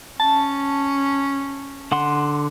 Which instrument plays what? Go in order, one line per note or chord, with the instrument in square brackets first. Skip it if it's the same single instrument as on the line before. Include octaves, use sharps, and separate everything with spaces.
[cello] C#4 [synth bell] A5
[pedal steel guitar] D3 F#5 C6